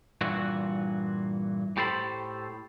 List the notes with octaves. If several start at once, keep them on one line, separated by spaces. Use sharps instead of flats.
G2 A#2 E3 F#4
A2 G4 A4 C5 B5